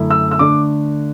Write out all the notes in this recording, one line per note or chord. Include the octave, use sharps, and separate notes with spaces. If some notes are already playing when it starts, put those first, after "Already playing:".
Already playing: F#2 D3 A3 E4
E6
E6
D3 A3 D4 D6